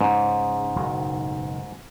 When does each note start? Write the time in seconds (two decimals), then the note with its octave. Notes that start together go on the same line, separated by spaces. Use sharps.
0.01 G#2 C#3
0.76 F#1 B1 D#3